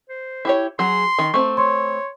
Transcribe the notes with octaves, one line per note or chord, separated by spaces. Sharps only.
C5
E4 G4 C#5
F#3 G#4 C6
D#3
A3 C4 C#6
C#5 C6 C#6